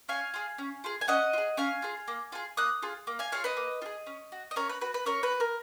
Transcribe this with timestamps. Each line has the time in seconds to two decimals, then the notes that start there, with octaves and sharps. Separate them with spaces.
0.08 C#4 F5 G#5
0.34 F4 G#4
0.58 C#4
0.84 F4 G#4
1.01 G#5
1.08 C#4 D#5 F#5
1.33 F4
1.38 G#4
1.57 C#4 F5 G#5
1.82 F4 G#4
2.08 A#3
2.32 F4 G#4
2.57 A#3 D#6 F#6
2.82 F4 G#4
3.07 A#3
3.19 F5 G#5
3.32 F4 G#4 C#5 F5
3.44 B4 D#5
3.57 A#3
3.82 F4
3.86 G#4
4.06 C#4
4.32 F#4
4.51 D#5
4.56 C#4 A#4 C#5
4.69 B4
4.81 F#4 B4
4.94 B4
5.06 C#4 A#4 C#5
5.23 B4
5.32 F#4
5.40 A#4